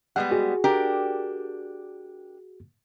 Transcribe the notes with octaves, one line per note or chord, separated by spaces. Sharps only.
G3 G#3 B3 F#5
F#4 G#4
D4 G4 A#4